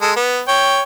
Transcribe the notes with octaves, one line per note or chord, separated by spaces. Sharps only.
G#3 A4 D#6
B3
C#5 G5